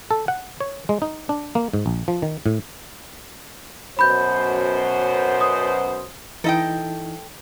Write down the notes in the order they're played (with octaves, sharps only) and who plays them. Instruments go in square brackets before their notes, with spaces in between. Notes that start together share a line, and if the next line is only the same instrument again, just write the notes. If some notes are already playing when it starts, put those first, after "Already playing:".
[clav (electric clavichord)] A4
F#5
C#5
G#3
D#4
D4
A#3
G#2
A#1
F3
D#3
A2
[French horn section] F#2 B2 C5 [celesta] B5 G6
[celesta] D#6
[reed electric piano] E3 D#4 E4 [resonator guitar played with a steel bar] A4 D#5 G5